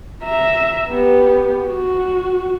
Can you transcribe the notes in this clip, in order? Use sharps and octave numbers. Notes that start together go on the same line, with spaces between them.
E5 A#5
B3 G4
F#4